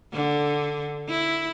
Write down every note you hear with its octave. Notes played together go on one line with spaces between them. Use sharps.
D3
E4